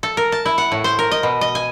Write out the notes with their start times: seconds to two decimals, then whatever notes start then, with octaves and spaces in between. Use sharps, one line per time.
0.03 A4
0.17 A#4
0.32 A5
0.46 E4
0.58 F#5
0.72 A2
0.84 C5
0.99 A#4
1.11 D#5
1.23 B2
1.41 D#5
1.55 G#5